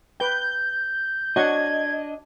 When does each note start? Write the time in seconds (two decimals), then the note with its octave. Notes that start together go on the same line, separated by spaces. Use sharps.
0.20 B4 G5 G6
1.36 D4 F#4 C#5 D#5 F#5 G#6